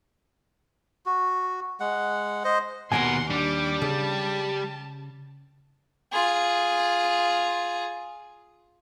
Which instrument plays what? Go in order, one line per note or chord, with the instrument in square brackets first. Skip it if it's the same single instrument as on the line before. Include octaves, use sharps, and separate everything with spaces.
[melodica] F#4
G#3 F#5
C5 D#5
[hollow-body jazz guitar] D#2 E3 G#5 [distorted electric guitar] B2 A#4 [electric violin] F#5 C6
[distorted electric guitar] G3 [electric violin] D4 D6
[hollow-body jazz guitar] C#3 [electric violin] A5
[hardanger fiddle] F4 G#4